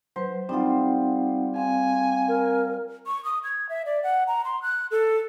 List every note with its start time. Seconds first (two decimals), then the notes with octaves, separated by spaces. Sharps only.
0.16 F#3 B4 C5
0.49 G3 C4 D#4 F4 F#5
1.56 C4 F5 G#5
2.28 A#4
3.06 C#6
3.25 D#6
3.44 G#6
3.69 E5
3.86 D5
4.03 F#5
4.27 A#5
4.45 C6
4.62 F#6
4.91 A4